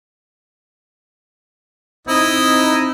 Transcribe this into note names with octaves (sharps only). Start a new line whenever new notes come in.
C4 D#4 E4 D#5